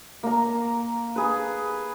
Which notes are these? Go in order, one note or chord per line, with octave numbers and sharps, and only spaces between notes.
A#3 A#5
G#4 B4